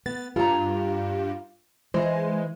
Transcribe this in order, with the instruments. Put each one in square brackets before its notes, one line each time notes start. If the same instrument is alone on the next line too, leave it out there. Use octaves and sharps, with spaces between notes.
[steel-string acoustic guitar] B3 [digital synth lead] A6
[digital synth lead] G2 [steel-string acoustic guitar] F4 A#5
[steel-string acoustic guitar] E3 C5 [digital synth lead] G#3